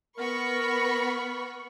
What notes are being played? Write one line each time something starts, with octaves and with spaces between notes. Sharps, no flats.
B3 A#4 B5 C#6